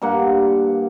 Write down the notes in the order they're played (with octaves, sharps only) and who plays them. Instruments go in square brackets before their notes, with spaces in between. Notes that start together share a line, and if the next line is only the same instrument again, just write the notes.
[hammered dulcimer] G2 A#3 F#5